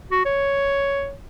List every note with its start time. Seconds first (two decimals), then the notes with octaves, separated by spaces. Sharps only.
0.11 F#4
0.25 C#5